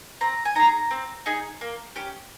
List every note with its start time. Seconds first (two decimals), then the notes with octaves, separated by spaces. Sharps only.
0.21 C4 A#5
0.45 G#5
0.55 D#4 G#4 A#5
0.91 C4
1.26 D#4 G#4
1.61 A#3
1.96 C#4 G4